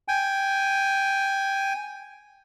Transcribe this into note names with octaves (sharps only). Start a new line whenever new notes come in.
G5 G#5